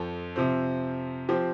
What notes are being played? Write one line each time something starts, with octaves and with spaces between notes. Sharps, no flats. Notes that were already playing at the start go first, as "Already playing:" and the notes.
Already playing: F2 F3 C4 A4
C3 F3 C4
F3 C4 G4